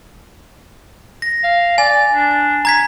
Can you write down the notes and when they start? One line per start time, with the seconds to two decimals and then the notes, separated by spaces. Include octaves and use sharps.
1.22 A#6
1.43 F5
1.78 D5 G#5
2.13 D4
2.65 A#5 G#6 B6